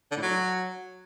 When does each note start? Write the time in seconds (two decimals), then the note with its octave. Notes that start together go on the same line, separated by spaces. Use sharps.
0.11 D3
0.17 A2
0.22 F#3